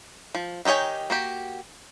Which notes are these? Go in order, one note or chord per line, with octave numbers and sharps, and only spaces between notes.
F3
D#3 D#4 G4 C#5 G#5
A#3 F#4 G4